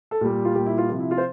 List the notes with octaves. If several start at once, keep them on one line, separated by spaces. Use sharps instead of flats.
A4
A#2 G3 G4
F4
A#2 G3 G4
E4
F4
C3 F3 E4
E4
F4
C5